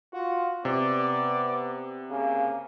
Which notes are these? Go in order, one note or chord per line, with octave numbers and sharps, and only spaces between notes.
F4 F#4
C3 B3 D5
C#3 A#3